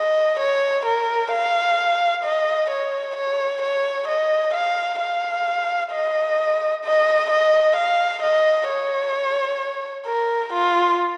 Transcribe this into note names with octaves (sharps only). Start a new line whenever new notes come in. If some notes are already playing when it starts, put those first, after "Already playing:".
Already playing: D#5
C#5
A#4
F5
D#5
C#5
C#5
C#5
D#5
F5
F5
D#5
D#5
D#5
F5
D#5
C#5
A#4
F4